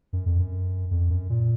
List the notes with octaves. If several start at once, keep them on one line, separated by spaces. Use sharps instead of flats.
F#2
F2
F#2
F2
F#2
A#2